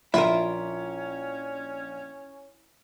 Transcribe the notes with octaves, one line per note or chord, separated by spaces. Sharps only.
A#1 C#4 E4 F4 A#4 E5